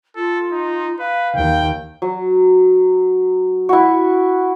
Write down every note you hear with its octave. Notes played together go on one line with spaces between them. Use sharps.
F4 A4
D#4
B4 F5
D#2 G5
F#3
E4 F#4